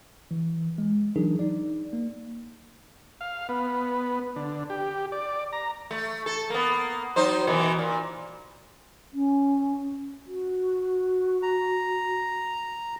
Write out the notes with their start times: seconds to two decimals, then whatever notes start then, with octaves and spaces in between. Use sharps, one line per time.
0.31 E3
0.78 G#3
1.16 E3 F#3 D4 D#4 G#4 A#4
1.39 D#4 D5
1.93 A#3
3.21 F5
3.49 B3
4.36 D3
4.70 G4
5.12 D5
5.53 A#5
5.91 A3
6.26 A4
6.50 A#3 B3
7.16 F#3 D#4 C5
7.47 B2 D#3 E3
7.79 A#2
9.14 C#4
10.26 F#4
11.43 A#5